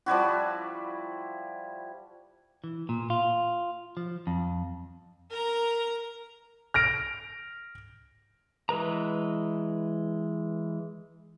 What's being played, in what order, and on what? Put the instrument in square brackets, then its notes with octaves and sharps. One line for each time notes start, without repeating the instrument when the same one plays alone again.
[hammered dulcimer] F3 G3 E4 F#4
[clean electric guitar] E3
A#2
F4
F3
F2
[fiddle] A#4 A#5
[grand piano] F6 A#6 D7
[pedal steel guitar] E3 G#3 B4 A#5